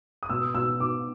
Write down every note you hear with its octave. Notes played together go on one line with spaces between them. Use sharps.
D#6
B2 E6
B2 E6
B2 D6